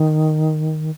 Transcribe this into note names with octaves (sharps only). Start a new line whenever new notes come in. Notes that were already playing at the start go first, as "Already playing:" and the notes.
Already playing: D#3